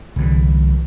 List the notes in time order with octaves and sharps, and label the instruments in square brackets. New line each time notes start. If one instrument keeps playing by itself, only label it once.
[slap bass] C2 D3 E3